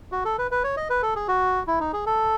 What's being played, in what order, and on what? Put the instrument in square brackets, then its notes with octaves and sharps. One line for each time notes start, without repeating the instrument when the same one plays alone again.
[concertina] F#4
A4
B4
B4
C#5
D#5
B4
A4
G#4
F#4
E4
D#4
G#4
A4